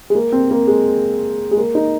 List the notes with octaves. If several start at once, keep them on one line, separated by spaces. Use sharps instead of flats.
G#3
A#3
C4
A#3
G#3
G#3
A#3
D#4